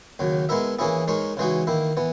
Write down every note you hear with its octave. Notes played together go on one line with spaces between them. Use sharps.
D#2 C#3 F#3
G#3 B3 E4 A#4 E5
E3 A#3 C#4 E4 G#4
G#3 D#4 A#4 C#5
C#3 E3 G#3 D#4 F#4
D#3 A#3 E4
E3 B3